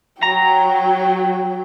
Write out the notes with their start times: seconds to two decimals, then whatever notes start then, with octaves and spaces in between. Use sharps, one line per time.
0.23 F#3 G5 A#5